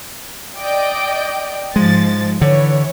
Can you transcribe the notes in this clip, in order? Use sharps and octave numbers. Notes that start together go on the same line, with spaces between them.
D5 D#5 G5
G#2 F3 G#3 A6
D3 E3 C#5